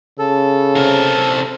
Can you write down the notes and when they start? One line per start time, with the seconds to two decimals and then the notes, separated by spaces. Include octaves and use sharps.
0.19 C#3 A4
0.77 C3 A#4